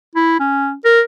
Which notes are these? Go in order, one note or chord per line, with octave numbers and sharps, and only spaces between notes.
E4
C#4
A#4